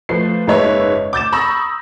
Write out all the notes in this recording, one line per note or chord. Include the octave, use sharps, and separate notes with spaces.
F3 A3 F4 B4 C7
F#1 G#2 A#3 B4 C#5 E5
D6 G6 A6 E7
A#5 B5 C#6 D#6 E6 A#6